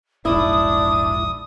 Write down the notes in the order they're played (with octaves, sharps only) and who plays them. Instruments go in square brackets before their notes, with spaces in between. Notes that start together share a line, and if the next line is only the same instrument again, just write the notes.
[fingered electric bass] E1 A#1 G#2 [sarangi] D4 [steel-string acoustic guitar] E4 [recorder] D#6